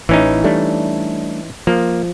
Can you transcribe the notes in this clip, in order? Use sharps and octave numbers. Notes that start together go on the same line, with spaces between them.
A1 E3 C#4 D#4
G3 A3 D4
F3 A#3